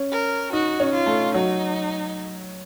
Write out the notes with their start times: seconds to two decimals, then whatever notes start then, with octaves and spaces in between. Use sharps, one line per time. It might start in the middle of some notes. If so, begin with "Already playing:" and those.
Already playing: C#4
0.12 A#4
0.53 D#4 F#4
0.80 C#4
0.93 F4
1.07 A3
1.34 F#3 D#4